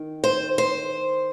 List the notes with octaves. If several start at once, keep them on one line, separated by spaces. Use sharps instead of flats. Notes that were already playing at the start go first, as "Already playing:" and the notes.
Already playing: D#3
C5
C5